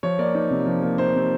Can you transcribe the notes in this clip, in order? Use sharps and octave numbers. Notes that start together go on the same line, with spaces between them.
F3 C#5
A#3 D5
D#4
C3
F3
A#3
D#4 C5
C3